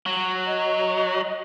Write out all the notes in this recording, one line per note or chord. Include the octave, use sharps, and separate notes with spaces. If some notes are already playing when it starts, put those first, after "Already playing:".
F#3
D#5